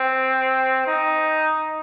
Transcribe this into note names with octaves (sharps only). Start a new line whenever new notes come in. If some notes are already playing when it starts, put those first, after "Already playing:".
Already playing: C4
D#4